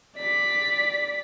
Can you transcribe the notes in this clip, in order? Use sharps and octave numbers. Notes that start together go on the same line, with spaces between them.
D5 B6